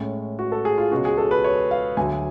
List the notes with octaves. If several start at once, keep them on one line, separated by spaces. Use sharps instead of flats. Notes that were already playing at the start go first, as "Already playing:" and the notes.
Already playing: A2 G#3 C#4
F#4
A4
G#4
F4
C#2 B2 G#3 C#4 F#4
G#4
A4
B4
C#5
F5
D2 D3 F#3 G#5